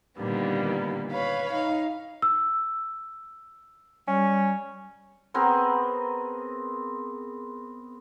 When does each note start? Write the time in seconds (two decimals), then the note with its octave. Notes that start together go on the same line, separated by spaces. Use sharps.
0.19 A#2 D3 D#3 G3 A#3 B3
1.12 B4 C#5 F5 B5
1.53 D#4 F5
2.22 E6
4.07 G3 C#4
5.34 B3 C4 G#4 A#4